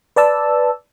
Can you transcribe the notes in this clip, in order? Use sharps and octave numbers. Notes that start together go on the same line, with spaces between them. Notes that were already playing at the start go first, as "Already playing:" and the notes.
B4 D5 A5 E6